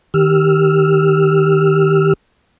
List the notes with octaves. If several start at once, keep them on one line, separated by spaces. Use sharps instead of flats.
D#3 G4 E6 F6